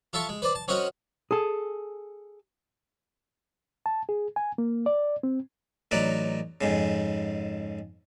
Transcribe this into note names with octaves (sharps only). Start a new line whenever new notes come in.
F4 A4 E5 A5 C#6
G#3
B4 C5 D5
A5
C4 C#4 F#4 A#4 D#5 F#5
G#4 A4
A5
G#4
G#5
A#3
D5
C4
A1 F#3 D#4 B4 D5
F2 G#2 C#3